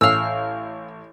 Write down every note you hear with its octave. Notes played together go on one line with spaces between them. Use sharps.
A1 F5 E6